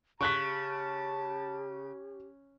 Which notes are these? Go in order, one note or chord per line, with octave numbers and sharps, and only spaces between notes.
C#3 G4 A5 C#6 F#6 B6